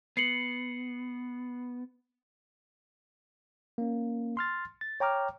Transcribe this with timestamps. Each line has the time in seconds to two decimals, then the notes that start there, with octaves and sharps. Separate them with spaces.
0.17 B3 C7 C#7 F#7
3.78 A#3 C#4
4.37 C6 F6 A6
4.81 A6
5.00 C#5 G5 A#5 D6 F6